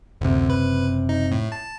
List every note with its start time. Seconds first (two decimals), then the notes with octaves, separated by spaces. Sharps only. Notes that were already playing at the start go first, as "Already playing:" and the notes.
0.21 F#1 D2 C3
0.50 B4
1.09 D#4
1.32 A2
1.52 A5